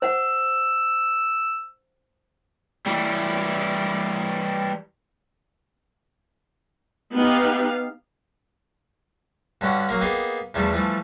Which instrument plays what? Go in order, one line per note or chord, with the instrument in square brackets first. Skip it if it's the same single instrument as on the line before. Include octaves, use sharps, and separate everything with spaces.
[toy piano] C5 F#5 [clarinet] E6
[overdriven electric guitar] E3 G3
[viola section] B3 D#4 G4 F5
[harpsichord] G2 D3 C#4 F#4 G4 F#5
F#3 A#3 A#4
A#3 B3 D#4 G4 G#4
E2 E3 F3 G3 A3 C#6
E3 F3 G3 A3